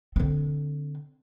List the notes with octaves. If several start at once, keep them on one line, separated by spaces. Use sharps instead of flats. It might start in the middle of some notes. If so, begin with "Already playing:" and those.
D3 C4